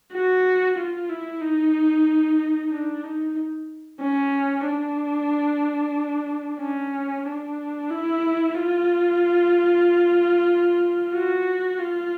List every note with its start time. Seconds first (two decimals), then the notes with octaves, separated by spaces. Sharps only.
0.13 F#4
0.78 F4
1.10 E4
1.41 D#4
2.72 D4
3.04 D#4
4.01 C#4
4.66 D4
6.60 C#4
7.26 D4
7.90 E4
8.54 F4
11.13 F#4
11.79 F4